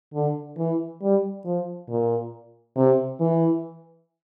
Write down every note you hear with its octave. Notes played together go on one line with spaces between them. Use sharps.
D3
E3
G3
F3
A#2
C3
E3